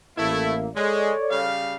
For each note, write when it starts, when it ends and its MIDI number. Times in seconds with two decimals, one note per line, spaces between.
0.18 0.67 33
0.18 0.56 57
0.18 0.67 58
0.18 0.56 64
0.18 0.67 76
0.76 1.13 56
0.76 1.47 69
0.76 1.47 73
0.76 1.47 74
1.31 1.77 49
1.31 1.77 55
1.31 1.77 77